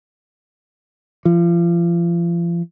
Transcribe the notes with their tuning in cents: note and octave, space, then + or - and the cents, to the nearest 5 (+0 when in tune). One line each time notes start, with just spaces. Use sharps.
F3 -35